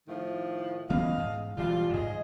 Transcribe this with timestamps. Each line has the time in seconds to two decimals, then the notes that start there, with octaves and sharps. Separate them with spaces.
0.08 A2 D#3 F3
0.90 E3 B3 C#4 D#5 F5
1.18 G#2
1.57 E1 E3 F#3 G3 F4
1.94 G#2 G#4 D#5